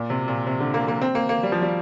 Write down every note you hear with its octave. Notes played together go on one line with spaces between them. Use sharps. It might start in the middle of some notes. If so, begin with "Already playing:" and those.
Already playing: A#2
C3
A#2
C3
D3
A#3
A#3
C4
A#3
A#3
G3
F3
G3